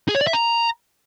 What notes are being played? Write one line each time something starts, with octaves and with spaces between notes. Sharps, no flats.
G#4
C#5
D5
E5
A#5